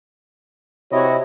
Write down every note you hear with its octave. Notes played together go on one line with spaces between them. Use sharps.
C3 E4 F#4 C#5 D#5